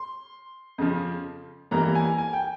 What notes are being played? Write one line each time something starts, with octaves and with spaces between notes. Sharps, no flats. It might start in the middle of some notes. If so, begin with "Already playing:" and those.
Already playing: C6
F2 C#3 F3
F2 E3 G3 A#3 A#5
G#5
G#5
G5